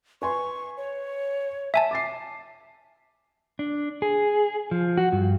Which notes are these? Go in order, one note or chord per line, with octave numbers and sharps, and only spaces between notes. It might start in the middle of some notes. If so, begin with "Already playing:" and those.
B4 G#5 C6 C#6
C#5
E5 G#5 A5
D6 A6 C7
D4
G#4
F3
F#4
G2